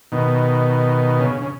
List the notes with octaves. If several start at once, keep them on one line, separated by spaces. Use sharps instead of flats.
B2 D#3
C#3
C#3